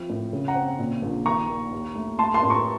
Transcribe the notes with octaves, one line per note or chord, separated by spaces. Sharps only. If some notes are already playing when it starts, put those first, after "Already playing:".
Already playing: F3 C4
A2
C#3
F#5 A#5
C4
A#2
A#1
D#3 A#5 C#6
A#3
D#2
A3
A3 A5 C6
A5 C6
A2
A#5 C#6